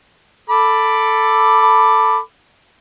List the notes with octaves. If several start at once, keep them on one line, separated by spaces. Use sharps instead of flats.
A4 B5 D6